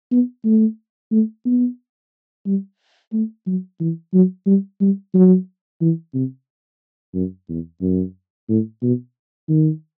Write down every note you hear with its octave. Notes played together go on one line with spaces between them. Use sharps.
B3
A3
A3
B3
G3
A3
F#3
E3
F#3
G3
G3
F#3
E3
C3
F#2
E2
F#2
A2
B2
D#3